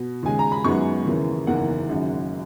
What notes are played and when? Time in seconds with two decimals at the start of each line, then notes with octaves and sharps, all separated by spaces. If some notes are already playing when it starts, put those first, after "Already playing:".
Already playing: B2
0.23 D#2 C#3 G#3 G#5
0.39 A#5
0.52 B5
0.64 F#2 D#3 G#3 B3 C#6
1.06 D#2 C#3 E3 A#3
1.47 F#1 E2 D#3 A#3 F#5
1.89 G#1 F#2 C#3